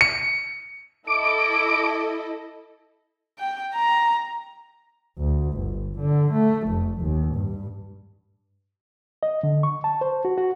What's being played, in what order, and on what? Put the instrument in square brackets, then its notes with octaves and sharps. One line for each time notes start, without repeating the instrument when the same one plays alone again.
[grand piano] C#7
[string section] E4 A4 D#5 [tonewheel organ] D6
[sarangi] G5
A#5
[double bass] D2
G1
D3
A3
F1
D#2
G2
[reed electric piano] D#5
D3
C#6
A5
C5
F#4
F#4